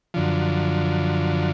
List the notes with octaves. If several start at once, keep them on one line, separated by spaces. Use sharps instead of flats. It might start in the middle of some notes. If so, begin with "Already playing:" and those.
F#2 D3 F3